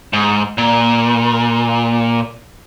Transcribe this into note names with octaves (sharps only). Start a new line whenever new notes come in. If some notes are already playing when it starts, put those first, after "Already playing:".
G#2
A#2